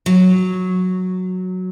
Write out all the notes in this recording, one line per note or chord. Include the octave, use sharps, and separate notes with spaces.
F#3